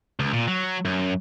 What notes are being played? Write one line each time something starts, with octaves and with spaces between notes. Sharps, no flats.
C#2
A#2
F#3
F#2